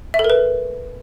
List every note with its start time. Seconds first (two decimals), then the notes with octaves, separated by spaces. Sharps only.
0.14 E5
0.19 A4
0.24 A#4
0.30 B4